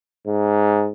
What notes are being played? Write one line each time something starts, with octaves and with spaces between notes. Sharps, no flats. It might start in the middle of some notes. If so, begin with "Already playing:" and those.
G#2